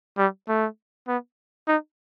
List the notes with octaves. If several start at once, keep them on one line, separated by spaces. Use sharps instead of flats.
G3
A3
B3
D#4